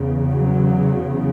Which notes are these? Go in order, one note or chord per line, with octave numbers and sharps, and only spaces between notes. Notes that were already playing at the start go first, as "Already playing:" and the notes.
Already playing: E2 C#3
F#3